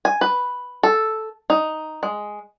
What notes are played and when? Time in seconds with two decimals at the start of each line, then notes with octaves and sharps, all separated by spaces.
0.05 G#5
0.21 B4
0.83 A4
1.50 D#4
2.03 G#3